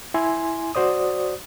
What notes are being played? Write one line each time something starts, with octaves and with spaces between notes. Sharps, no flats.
E4 G#5 C6
F#4 C5 D5 D#6